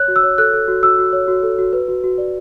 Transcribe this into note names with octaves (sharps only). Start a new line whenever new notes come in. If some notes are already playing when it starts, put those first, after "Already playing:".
Already playing: C#5 F#6
F#4
E6
C#5
A4 F#6
A4
F#4
F#4 E6
F#4
C#5
F#4
A4
F#4
B4
F#4
F#4
D5